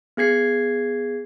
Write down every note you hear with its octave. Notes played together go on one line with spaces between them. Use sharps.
B3 G#4 G#6 C7